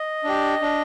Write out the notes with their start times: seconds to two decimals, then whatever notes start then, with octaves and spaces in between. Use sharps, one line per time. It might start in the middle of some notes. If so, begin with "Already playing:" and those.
Already playing: D#5
0.24 D4 G4
0.62 D4